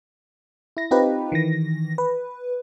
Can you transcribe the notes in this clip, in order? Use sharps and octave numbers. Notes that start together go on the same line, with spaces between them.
E4 A#6
C4 D#4 F4 G4 B4
D#3 E3 A#6
B4